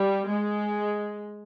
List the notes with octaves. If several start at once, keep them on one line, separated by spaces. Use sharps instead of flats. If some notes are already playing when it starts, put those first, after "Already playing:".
Already playing: G3
G#3